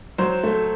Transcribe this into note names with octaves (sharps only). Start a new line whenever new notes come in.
F#3 C5
A3